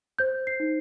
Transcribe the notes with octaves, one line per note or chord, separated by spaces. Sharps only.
C5 G6
C7
D#4